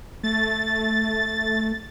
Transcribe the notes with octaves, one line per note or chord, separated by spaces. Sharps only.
A3 A6